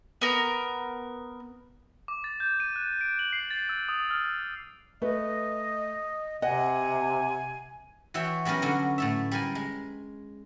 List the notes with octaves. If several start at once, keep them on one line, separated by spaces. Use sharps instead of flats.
B3 A#4
D6
A6
G6
D#7
F#6
D7
F#7
C7
A6
E6
D#6
F6
A3 B4 D#5
C3 D#5 F#5 G#5
E3 F#4 C#5 E5 G5
F#3 G3 B3 C#4 A#4
D3 F#3 C#4
A2 A4 E5
G3 A#4 G#5
G#3